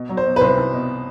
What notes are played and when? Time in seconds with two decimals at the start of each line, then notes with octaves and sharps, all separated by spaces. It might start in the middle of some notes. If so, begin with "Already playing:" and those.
Already playing: B2
0.09 F#3
0.17 C5
0.25 B2
0.36 B4
0.41 C2 C5
0.58 C2
0.73 B2